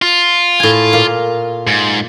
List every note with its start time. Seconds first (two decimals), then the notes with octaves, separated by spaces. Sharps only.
0.02 F4
0.60 A2 G#5
0.93 A#2 F5
1.67 G#2